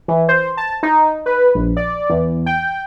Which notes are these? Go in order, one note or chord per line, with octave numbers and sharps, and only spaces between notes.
E3
C5
A5
D#4
B4
A#1
D5
E2
G5